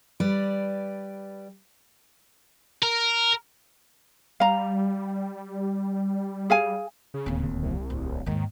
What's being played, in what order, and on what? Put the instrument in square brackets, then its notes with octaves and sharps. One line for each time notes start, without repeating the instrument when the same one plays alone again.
[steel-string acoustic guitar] G3 B4 D5
[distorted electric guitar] A#4
[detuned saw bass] G3 [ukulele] F5 A#5
[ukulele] G#4 F5 G#5
[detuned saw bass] C#3
[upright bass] D1 D#2
[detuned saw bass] C2
[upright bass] D1
[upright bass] D#2 G#2 [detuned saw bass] D#3